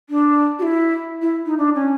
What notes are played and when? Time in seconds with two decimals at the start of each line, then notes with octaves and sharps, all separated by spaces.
0.10 D4
0.59 F#4
0.62 E4
1.22 E4
1.46 D#4
1.58 D4
1.75 C#4